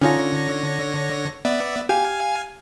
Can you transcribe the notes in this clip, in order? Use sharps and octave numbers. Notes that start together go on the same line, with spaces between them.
D3 C#4 D#4 F4 C#5 A#6
B3 D5 E5
G4 F5 G#5